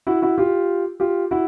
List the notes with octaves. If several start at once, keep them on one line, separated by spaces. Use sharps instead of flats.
E4 F#4
E4 F#4
F4 G4
F4 G4
E4 F#4